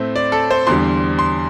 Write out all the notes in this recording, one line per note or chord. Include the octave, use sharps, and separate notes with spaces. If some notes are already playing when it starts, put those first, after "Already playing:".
Already playing: A2 A3 C4
D5
A4
C5
E2 D3 G3 C6
C6